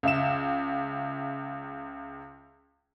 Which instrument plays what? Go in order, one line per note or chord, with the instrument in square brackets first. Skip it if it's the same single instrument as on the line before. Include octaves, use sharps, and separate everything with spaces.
[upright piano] C#2 E5 E7